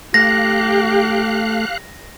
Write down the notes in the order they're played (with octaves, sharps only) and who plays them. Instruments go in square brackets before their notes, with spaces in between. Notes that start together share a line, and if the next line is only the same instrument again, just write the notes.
[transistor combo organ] A3 [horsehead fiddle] G4 [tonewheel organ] F5 F#6 [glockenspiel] A#6